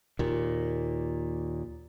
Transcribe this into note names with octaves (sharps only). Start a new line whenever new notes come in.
D#2 A#2